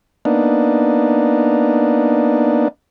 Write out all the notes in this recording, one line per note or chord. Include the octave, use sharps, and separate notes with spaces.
A#3 B3 D4 D#4